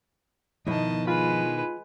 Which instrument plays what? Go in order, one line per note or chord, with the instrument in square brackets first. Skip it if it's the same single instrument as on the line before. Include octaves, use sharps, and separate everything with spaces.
[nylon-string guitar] B2 D#3 E4 [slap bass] F3 B3 [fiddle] D#5 A5
[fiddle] G#3 B4 [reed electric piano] F4 B5